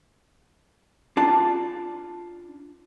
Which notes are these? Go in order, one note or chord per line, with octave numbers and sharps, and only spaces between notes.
D4 F4 A5